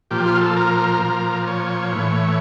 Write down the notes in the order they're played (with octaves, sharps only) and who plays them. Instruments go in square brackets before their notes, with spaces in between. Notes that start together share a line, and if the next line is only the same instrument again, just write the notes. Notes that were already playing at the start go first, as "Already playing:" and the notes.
[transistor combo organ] A#2 F3 G4
F4
A4
A#4
A#2 F3
C#5
A2 E3